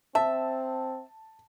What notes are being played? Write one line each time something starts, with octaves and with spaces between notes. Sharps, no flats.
C4 E5 A5